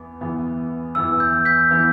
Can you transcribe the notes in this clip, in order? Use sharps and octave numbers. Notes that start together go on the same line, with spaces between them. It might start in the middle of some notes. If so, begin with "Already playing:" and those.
Already playing: E2 E3 B3
E2 E3 B3
E2 E3 B3 E6
G6
G6 B6
E3 B3